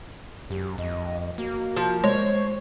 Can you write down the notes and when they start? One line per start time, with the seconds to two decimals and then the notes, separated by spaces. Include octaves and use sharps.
0.50 F#2 G4
0.78 F2 D#5
1.38 A#3 F#4
1.76 F3
2.04 G#3 C5 C#5